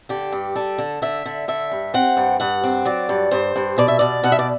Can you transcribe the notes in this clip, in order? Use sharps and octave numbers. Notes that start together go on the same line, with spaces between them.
D3 G4
G2
G3 A4
D3
D3 E5
D3
D3 E5
G2
C4 F#5
G2
G2 F#5
C4
F#3 D5
G2
G2 C5
G2
B2 D5
E5
B2 D5
B2 F#5
E5
D5